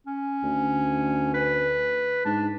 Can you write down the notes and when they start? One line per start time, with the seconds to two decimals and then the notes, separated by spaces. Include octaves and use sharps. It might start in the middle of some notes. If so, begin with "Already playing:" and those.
0.07 C#4
0.43 D2
1.34 B4
2.25 G#2 D4